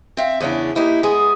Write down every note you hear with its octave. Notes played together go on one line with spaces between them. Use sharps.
C4 E5 F5
E2 C#3 C#4 D4 E4
E3 A#3 D#4 E4 G4
G#3 B3 G#4